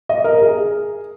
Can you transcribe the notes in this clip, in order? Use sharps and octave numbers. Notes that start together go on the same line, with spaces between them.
D#5
A#4
G#4